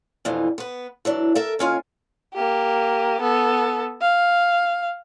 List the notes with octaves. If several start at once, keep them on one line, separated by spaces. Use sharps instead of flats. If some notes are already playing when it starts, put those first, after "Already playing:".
F2 B2 D3 E3
B3 B4
E3 F#3 D4
A4 A#4 E5
D#2 C#4 F4 G#5
A#3 G4
B3 A4
F5